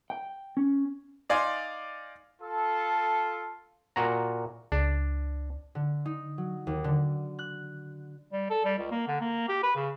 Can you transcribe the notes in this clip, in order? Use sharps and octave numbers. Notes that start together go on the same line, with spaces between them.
G5
C#4
D#4 D5 F5 G#5 C6
F4 A4
A#2 F#4 A#5
C#2 D4
D3
D#4
F#3
D#2
D3
F#6
G3
A4
G3
C#2
A#3
D3
A#3
G4
B4
C#3